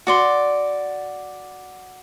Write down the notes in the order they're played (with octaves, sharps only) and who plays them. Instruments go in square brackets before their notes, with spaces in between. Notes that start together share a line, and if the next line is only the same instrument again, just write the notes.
[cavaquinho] F#4 D5 C6